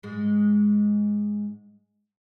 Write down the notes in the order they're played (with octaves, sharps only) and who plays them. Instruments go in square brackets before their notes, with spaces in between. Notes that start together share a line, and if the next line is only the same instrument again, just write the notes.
[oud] G#2 G#3